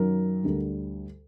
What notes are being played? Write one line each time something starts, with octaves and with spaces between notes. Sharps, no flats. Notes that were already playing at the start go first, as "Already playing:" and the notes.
Already playing: F#2 D#3 F#3 A#4
D2 D3 G3